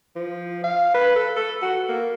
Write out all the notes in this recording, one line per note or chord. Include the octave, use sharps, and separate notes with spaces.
F3
F5
B4
A4
A4
F#4
A#3